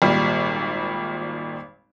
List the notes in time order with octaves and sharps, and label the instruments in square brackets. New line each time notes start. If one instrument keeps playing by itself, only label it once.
[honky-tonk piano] G#1 A#2 G3